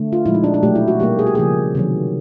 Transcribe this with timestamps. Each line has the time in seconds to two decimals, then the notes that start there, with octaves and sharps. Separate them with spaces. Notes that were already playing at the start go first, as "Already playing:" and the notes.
Already playing: D3 A3
0.13 F4
0.26 A#2 F3 G#3 E4
0.34 D#4
0.44 D4
0.54 D4
0.63 B2 F#3 A3 G4
0.75 E4
0.88 F#4
1.00 B2 G3 A#3 G4
1.19 G#4
1.27 G4
1.35 C#3 F3 A#3 G#4
1.75 C3 D#3 F#3